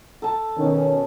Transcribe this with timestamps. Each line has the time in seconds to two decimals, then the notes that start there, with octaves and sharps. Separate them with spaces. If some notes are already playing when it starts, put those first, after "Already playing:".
0.22 A4 A5
0.57 B2 D#3 C#4